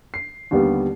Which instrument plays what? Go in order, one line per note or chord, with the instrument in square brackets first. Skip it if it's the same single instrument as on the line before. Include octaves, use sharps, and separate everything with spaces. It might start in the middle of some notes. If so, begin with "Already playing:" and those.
[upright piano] C7
D#2 D3 G3 B3